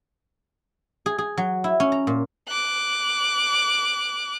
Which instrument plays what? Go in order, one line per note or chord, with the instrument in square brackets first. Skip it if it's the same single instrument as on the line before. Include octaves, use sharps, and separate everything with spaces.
[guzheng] G#4
G#4
F#3
E4
C#4
A#5
A#2
[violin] D6 F#6